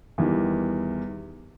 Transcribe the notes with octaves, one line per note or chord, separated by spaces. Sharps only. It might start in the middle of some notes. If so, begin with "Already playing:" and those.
E2 D#3 E3 G3